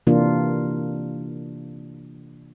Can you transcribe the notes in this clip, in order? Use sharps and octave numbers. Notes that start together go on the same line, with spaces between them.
C3 E3 A#3 D4 F4